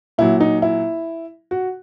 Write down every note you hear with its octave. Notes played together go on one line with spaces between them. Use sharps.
A#2 F#3 E4
D#4
E4
F#4